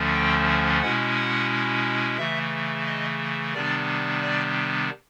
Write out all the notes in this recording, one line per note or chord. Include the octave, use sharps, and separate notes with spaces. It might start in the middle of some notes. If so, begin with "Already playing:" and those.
Already playing: D2 D3 F3 A3 C#4
G5
B2 G#3 C#4 E4 F#5
F#5
C#3 E3 A3 E5
D#5
C3 D#3 G3 B3 D4 D5
D5